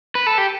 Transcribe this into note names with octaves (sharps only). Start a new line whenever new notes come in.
B4
A4
G4